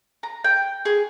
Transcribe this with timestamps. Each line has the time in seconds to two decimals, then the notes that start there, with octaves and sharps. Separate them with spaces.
0.23 A#5
0.44 G5
0.85 G#4